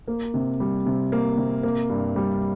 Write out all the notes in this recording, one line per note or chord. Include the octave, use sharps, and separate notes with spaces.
A#3
C3
G3
C3
A#3
C3
A#3
G2
G3